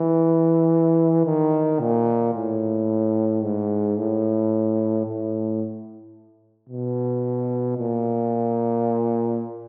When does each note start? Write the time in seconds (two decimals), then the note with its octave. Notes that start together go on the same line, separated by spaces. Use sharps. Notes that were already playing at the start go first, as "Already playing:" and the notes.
Already playing: E3
1.25 D#3
1.80 A#2
2.34 A2
3.43 G#2
3.97 A2
5.06 A2
6.69 B2
7.78 A#2